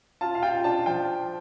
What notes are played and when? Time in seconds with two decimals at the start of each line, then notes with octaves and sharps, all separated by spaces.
0.21 F4 A5
0.35 F5
0.42 F4 G5
0.64 D4 A5
0.86 F3 G5